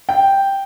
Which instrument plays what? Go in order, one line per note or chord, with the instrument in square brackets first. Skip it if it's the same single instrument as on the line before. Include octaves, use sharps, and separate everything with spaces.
[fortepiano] G5